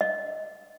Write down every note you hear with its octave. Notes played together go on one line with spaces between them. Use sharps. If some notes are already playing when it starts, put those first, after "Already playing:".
D#5